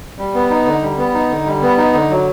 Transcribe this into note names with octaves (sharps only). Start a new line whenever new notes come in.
G3
B3
D#4
D3
G3
B3
D#4
D3
G3
B3
D#4
D3
F#3